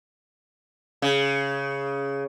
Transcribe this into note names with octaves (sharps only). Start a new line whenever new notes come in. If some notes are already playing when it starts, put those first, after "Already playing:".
C#3